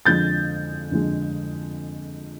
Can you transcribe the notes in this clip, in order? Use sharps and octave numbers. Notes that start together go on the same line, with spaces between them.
F2 D3 F3 G#3 G6 A6
F2 D3 F3 G#3